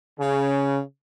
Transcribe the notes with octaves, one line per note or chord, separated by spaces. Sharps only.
C#3